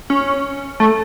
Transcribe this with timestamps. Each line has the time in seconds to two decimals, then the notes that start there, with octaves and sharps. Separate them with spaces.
0.10 C#4
0.80 A3